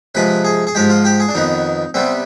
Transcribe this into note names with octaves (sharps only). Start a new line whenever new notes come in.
C3 F3 G#3 B4
G#4
G#4
G#2 F3 G#3 G4
F4
G4
G#4
D4
F2 D#3 B3 D#4
C3 G3 B3 C4